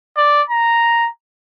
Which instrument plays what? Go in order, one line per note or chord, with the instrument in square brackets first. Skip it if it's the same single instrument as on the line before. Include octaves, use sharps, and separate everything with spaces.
[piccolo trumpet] D5
A#5